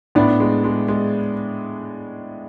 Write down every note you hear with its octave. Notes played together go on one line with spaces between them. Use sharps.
A2 B3 D4
G#3
G#3
G#3